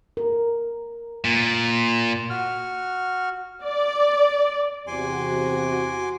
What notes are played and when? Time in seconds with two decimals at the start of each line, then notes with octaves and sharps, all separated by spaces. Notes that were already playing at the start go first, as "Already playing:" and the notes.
0.17 A#4
1.24 A#2
2.30 F#4 F6
3.62 D5
4.87 E2 C3 F#4 G#5 C6 D6